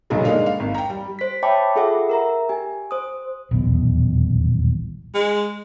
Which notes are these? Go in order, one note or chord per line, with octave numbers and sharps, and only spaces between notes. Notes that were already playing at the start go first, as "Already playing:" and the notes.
B1 G2 A#2 D3 F#3 G#3
G#3 A#3 D4 D#4 F5
F5
G#1
G5 A#5
G3
C5 B6
C#5 E5 G5 A5 B5 D6
F4 G#4 A4 E5 F#5
A#4 E5 A#5
G4 G#5
C5 D#6
D#1 B1 E2
G#3